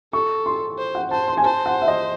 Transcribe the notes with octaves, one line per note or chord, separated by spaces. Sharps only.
A4 C#6
C6
C5
F#5
C5 A5
C6
G#5
C5 A5
F#5
E5
D#5